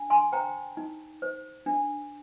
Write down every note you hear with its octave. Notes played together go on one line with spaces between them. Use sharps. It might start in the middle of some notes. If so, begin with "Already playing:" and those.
Already playing: D4
G#5 C6
C5 G5 A#5
D#4
C5
D4